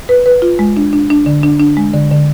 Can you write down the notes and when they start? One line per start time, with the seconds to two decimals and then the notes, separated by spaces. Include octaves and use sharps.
0.09 B4
0.26 B4
0.42 F4
0.59 G#3
0.77 D4
0.93 D4
1.10 D4
1.26 D3
1.43 D4
1.60 D4
1.77 G#3
1.94 D3
2.11 D3